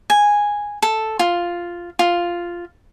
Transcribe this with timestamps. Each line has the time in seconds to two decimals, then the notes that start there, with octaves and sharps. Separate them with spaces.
0.10 G#5
0.82 A4
1.19 F4
1.99 F4